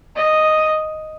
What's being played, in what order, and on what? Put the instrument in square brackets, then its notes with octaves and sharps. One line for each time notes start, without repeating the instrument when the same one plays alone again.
[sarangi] D#5